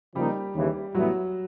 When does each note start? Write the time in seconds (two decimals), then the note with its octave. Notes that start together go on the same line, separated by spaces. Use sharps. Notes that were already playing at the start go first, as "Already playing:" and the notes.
0.15 C#3 F3 G3 A#3 D#4 G4
0.55 D#2 C#3 E3
0.95 A2 E3 F#3 G3 B3 E4 F#4